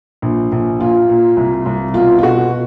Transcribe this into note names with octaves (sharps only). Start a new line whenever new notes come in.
A#1
A#1
A#2 F4
A#2
C2
C2
B2 F4
F4
B2 F#4